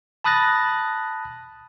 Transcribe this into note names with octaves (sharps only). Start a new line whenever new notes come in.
A5 B5 D#6 F#6 A6 A#6